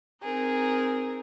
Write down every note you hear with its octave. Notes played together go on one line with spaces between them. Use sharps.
C4 D#4 G#4 A#4